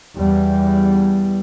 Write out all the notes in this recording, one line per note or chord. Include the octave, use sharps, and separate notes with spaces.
E2 G3